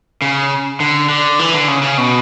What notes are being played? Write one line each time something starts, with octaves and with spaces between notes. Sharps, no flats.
C#3
D3
D3
E3
D3
C#3
C#3
B2